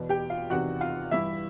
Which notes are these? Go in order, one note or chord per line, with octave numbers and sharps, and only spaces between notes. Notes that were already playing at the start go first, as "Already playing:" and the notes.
Already playing: E2 B2
G4 G5
F4 F5
E2 C3 D#3 F#4 F#5
F4 F5
G2 E3 E4 E5